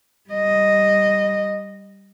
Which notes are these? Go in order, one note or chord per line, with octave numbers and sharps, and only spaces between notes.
G3 D#5